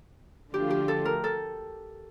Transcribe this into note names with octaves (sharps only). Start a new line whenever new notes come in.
D3 F3 A3 D4 F4 G4
G4
A4
A#4
A4